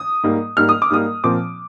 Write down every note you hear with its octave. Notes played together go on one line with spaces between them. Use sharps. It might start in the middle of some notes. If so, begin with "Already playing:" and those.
Already playing: D#6
G#2 G3 A#3
G#2 G3 A#3 F6
D#6
D6
G#2 G3 A#3 D#6
A#2 F3 C4 D6